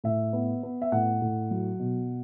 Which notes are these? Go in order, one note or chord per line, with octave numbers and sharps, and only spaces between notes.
A2 E5
B3
B3
E5
A2 F#5
A2
F#3
B2